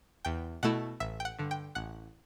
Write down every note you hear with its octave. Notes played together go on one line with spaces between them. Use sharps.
E2 G5
B2 A3 E4 F#5
A1 E5
G5
F#5
G2 D3
G5
A1 F#5